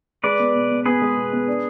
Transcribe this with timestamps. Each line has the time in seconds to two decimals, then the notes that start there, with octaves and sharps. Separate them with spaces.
0.24 G#3 B4 D5
0.39 B3
0.55 B2
0.70 B2
0.86 B3 G#4 B4
1.02 G#3
1.17 B2
1.33 B3
1.48 D4